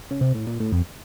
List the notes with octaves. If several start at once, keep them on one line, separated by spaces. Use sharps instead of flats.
C#3
C3
A2
A#2
A2
F2